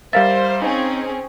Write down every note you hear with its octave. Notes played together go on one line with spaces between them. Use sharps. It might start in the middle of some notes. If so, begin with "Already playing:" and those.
G3 A#4 C5 E5 F5 A6
C4 C#4 D#4 G#4